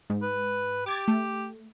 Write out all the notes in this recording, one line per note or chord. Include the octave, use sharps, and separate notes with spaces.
G#2
B4
G4 D6 G#6 A6
A3